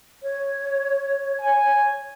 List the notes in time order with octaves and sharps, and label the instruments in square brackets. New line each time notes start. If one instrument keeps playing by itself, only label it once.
[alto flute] C#5
[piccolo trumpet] G#5